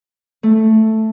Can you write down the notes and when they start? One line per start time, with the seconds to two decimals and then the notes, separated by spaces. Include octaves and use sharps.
0.43 A3